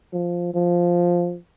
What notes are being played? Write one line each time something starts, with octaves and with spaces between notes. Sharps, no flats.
F3
F3